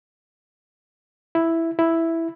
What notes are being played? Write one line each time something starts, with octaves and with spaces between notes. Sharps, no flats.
E4
E4